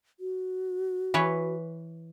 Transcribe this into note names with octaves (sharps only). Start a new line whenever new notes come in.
F#4
E3 B4 C#5